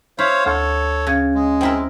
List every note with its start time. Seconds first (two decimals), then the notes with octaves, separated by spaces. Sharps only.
0.19 E4 C5 C#5 F5
0.46 D2 A4 C#5
1.07 C#3 G#6
1.35 G#3
1.61 C4 E4 A#4